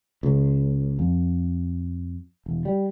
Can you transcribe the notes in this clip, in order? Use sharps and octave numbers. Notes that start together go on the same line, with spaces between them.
C#2
F2
E1
G3